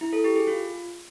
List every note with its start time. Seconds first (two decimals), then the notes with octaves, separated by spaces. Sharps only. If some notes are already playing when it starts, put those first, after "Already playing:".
0.01 E4
0.13 A4
0.24 G4
0.36 G#4
0.47 F4